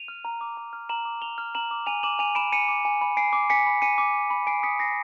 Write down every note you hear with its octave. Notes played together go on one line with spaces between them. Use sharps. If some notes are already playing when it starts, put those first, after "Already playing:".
Already playing: D#7 F7
F6
A#5
D6
A#5
F6
A#5 E7 F#7
D6
A#5 F7 G7
F6
A#5 E7 F#7
D6
G#5 D#7 F7
D6 E7 F#7
G#5 D#7 F7
B5 D7 E7
G#5 C#7 D#7
D6
G#5
B5
G#5 C7 D7
D6
G#5 B6 C#7
B5
G#5 C#7 D#7
D6
G#5
B5
G#5 C7 D7
D#6 B6 C#7
G#5 A#6 C7